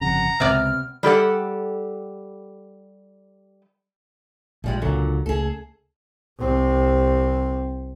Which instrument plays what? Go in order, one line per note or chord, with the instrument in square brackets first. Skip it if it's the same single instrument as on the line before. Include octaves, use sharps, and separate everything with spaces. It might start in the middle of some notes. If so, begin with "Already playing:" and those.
[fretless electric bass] G1 F2 C#3 [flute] F#5 [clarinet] A#5
[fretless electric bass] C#2 [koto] C3 B3 D5 [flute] F6
[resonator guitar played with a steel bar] G3 G4 A4 F#5
[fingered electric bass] A#1 [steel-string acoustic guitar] F3 G3 G#3
[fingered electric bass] C#2 [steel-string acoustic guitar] A#2 D3 F#3
[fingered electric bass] C#2 C#3 A3 [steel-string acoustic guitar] G#4 A4
[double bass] C2 C4